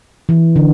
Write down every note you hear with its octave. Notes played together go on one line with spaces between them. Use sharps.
E3
D3